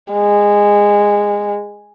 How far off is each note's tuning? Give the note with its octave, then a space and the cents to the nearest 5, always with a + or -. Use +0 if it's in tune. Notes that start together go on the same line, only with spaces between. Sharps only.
G#3 -15